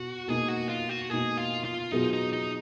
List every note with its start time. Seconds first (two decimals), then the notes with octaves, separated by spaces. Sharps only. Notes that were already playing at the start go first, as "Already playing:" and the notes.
Already playing: B2 F#4
0.28 B2 A#3 D#4 G#4
0.48 F#4
0.69 F4
0.89 F#4
1.10 B2 A#3 D#4 G#4
1.37 F4
1.65 F4
1.92 B2 F#3 B3 D#4 F4 G#4
2.13 D#4
2.33 D#4